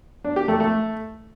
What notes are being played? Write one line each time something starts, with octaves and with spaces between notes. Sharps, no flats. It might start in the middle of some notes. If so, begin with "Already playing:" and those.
D4
G4
A3
A3